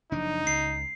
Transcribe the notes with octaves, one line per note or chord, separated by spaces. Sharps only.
F#1 F3 D4 D#4
C#2 C7